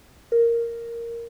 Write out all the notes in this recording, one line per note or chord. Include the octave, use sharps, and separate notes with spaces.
A#4